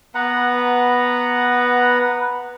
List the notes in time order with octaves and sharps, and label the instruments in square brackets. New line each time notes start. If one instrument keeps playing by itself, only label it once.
[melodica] B3 B4 F#5 A#5